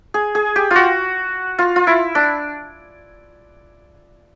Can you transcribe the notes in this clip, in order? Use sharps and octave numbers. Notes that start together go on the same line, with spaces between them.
G#4
G#4
G4
F4 F#4
F4
F4
E4
D4